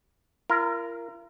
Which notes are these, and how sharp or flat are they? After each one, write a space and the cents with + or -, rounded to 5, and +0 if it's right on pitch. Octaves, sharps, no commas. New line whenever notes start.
F4 -45 A#4 +0